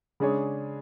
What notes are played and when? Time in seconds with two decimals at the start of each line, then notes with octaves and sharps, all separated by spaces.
0.20 C#3 G#3 D4 G#4 C#5